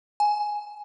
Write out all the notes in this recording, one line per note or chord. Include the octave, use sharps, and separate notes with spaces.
G#5